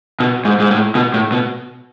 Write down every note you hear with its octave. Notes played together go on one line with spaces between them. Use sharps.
B2
G#2
G#2
A2
B2
A2
B2